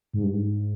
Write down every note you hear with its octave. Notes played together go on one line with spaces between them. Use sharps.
G#2
G2
G#2